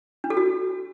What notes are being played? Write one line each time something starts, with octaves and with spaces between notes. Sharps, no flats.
D4
A4
F#4